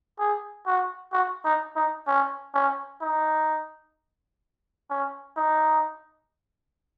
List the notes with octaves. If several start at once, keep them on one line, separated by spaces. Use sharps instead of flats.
G#4
F#4
F#4
D#4
D#4
C#4
C#4
D#4
C#4
D#4